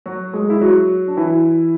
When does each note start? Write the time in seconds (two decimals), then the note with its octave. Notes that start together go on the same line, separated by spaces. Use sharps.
0.06 F#3 F#4
0.33 G#3 G#4
0.50 E4
0.61 F#3 F#4
1.08 D4
1.17 E3 E4